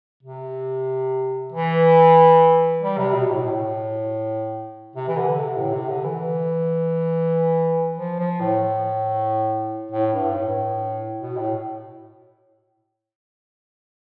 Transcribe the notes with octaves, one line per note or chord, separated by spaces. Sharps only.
C3
E3
G3
C3
B2
A2
B2
A2
C3
E3
D3
C3
A2
C3
D3
E3
F3
F3
A2
A2
G2
A2
B2
A2